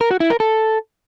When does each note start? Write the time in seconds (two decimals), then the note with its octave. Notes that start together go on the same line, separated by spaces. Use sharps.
0.01 A#4
0.11 F#4
0.20 E4
0.30 A#4
0.40 A4